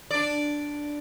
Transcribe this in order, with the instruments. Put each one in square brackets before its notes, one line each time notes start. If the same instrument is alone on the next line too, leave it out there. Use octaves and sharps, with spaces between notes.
[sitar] D4 D5